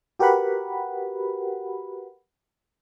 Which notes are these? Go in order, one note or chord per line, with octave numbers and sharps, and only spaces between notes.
F#4 G4 A#4 B4 F#5 B5